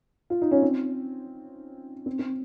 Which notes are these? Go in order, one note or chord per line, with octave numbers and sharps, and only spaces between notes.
F4
D#4
C#4
C4
C4
C4